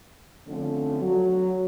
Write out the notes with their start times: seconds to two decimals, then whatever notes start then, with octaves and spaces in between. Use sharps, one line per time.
0.47 D3 F3 A3 C4 C#4
1.01 F#3